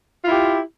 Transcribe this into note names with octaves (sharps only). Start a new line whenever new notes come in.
E4 F4 G4